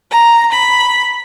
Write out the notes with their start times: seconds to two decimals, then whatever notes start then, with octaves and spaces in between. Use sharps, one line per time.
0.11 A#5
0.53 B5